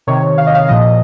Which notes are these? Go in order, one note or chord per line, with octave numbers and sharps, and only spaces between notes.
C3 D#3 C#5
F5
D#5
F5
A#2 F3 D#5